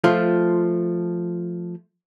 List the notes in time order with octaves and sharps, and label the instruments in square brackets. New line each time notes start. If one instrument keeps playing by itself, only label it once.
[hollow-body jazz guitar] F3 A3 F4